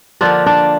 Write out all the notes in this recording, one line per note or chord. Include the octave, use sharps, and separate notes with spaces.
D3 F3 A#3 D4 F4
D4